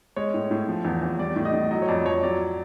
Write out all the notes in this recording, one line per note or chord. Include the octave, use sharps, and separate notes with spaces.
G#3 C#5
A2
A2
F3
E2
E2
G3 D5
A2
D#5
A2
F#3 D#5
C#5
F2 D5
F2 C#5
F#3 D5